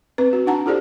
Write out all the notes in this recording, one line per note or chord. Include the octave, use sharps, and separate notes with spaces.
C4 B4
F#4
D4 D#4 F#5 A5 A#5
E4 F4 G4 A4 C5 D5